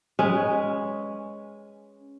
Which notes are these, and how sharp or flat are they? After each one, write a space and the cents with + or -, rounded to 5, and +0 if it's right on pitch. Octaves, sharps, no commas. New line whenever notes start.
G#3 -5 C#4 +0 B4 +0